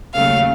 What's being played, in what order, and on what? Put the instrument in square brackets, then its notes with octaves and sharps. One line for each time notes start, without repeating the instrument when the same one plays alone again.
[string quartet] D#2 C#3 F#3 A3 C#4 F5